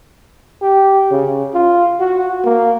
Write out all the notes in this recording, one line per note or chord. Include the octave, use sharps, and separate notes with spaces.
G4
C#3
F4
F#4
A#3